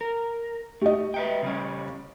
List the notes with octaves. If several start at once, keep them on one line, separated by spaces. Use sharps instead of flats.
A#4
A3 G4 D#5
B4 E5 G5
C#3 G3 C#4